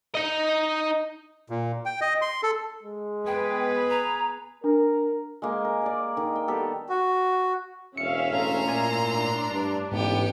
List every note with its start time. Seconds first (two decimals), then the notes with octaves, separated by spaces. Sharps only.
0.15 D#4 D#5
1.50 A#2
1.85 G5
2.01 D#5
2.22 C6
2.43 A4
2.83 G#3
3.27 B3 G#4 B4 G5
3.90 A#5
4.64 D4 A#4
5.42 G#3 A#3 G#5
5.65 A#4
5.82 G#4 D5
6.17 D#3
6.35 G5
6.48 G3 B3 G4 A4
6.89 F#4
7.97 E1 C#4 E5 F5 C#7
8.33 A2 A4 A#5 C6
8.67 A#2 F4 D5 G#5
9.12 D4
9.51 G2 D5
9.92 A1 G#2 B3 G4 G5